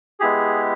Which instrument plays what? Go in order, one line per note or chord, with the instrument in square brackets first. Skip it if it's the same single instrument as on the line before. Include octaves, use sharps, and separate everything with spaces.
[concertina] G#3 B3 E4 G4 G#4